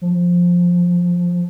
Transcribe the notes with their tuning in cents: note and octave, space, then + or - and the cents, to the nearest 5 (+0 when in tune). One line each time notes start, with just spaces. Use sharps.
F3 +10